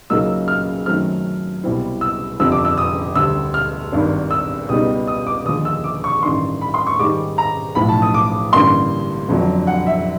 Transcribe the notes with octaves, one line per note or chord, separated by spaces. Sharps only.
C#2 C#3 F#3 A#3 D#4 E6
F6
F#2 D#3 F#3 A3 C4 F6
C2 B2 G3 C4 E4
E6
G1 F2 C3 F3 E6
D6
E6
D#6
D2 D3 G3 E6
F6
G#1 G2 D#3
E6
C#2 B2 G3 B3 D#4 D#6
D#6
D6
D#2 D3 F3 G#3 D#6
E6
D6
C#6
A1 G2 D#3 C6
B5
C6
C#6
G#2 D#3 G3 D6
A#5
B1 A2 F3 B5
A5
D#6
D6
A1 G2 D3 G3 A#3 C6
G1 F2 D3 F#3
F#5
E5